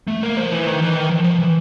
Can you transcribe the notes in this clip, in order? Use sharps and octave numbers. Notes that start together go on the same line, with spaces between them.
A3
A#3
F3
E3
D#3
E3
D#3
F3
F3
E3